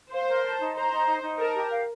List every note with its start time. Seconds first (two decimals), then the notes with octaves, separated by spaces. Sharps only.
0.11 C5 F5
0.27 A#4
0.44 A5
0.59 D#4
0.75 C5 A#5
0.92 D#4
1.07 D#4
1.23 D#4
1.39 A#4 A5
1.55 G4
1.71 F5